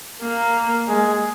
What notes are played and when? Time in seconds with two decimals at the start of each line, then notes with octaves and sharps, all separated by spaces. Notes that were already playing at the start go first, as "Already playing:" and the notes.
0.22 A#3
0.88 G#3